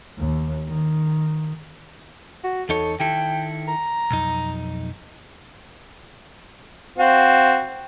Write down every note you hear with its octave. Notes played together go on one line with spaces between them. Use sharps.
D#2
D#3
F#4
E2 D#4 A4 C#5
D#3 E4 A4 G5
A#5
B1 F2 D#4
C4 F#4 F5